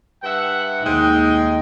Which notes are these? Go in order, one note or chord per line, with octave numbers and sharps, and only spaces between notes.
G2 E5 F#5
D#2 G#3 D#4 G5